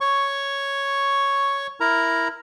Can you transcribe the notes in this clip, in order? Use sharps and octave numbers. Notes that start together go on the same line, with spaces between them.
C#5 C#6
E4 A#4 A#5